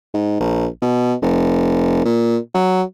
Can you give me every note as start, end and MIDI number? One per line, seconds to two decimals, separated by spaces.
0.14 0.38 44
0.40 0.67 34
0.82 1.14 47
1.22 2.04 29
2.05 2.37 46
2.54 2.83 54